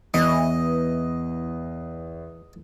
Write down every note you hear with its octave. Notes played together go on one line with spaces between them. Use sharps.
E2 E3 D#5